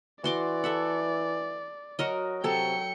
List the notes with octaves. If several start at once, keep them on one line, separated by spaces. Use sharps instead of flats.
E3 F#4 D5 C6 D6
A4 E5 F#5
F#3 F#4 A#4 D#5
C3 F#3 A4 C#5 G5 C#7